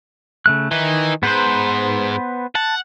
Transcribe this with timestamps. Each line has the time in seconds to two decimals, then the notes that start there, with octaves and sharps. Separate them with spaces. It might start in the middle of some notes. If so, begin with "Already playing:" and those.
0.46 C#3 A3 F#6
0.71 D#3 E3 D#4
1.23 G#2 B3 B4 C5
2.55 F#5 A5